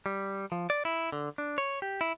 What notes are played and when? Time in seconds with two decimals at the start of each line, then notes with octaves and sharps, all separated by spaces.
0.06 G3
0.52 F3
0.70 D5
0.85 E4
1.12 D3
1.38 D4
1.58 C#5
1.82 G4
2.01 E4